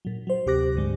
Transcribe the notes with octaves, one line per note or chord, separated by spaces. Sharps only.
A#2 F#3
F#3 C5
D2 C3 G4 D6 F#6 A#6
D2 G#2 D3 G#3